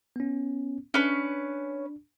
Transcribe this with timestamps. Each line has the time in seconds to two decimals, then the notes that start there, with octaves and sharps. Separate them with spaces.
0.16 B3 C#4
0.94 C#4 D4 B4